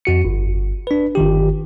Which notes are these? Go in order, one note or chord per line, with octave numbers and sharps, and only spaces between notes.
F2 F#4 C#7
G1
D4 B4
G1 D#3 G4